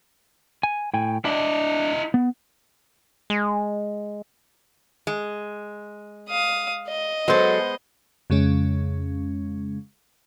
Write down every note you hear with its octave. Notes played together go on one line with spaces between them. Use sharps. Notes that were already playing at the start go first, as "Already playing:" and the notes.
G#5
A2 G5 G#5
D4 E4 D#5
B3
G#3
G#3
F5 D#6
D#5
F#3 G#3 B3 A4 C5
F2 C#3 G#3 C#4